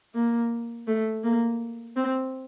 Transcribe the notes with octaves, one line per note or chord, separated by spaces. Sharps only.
A#3
A3
A#3
C4